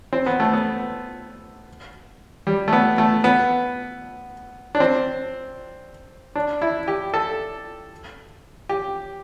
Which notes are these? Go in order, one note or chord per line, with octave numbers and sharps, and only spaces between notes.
C4
B3
A3
B3
G3
A3
B3
A3
B3
D4
C4
D4
E4
G4
A4
G4